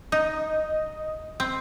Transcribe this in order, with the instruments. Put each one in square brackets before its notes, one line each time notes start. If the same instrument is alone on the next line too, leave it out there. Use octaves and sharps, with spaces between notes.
[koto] D#4 [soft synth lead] D#5
[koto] C4